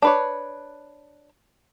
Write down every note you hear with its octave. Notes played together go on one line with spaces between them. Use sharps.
D4 B4 C#5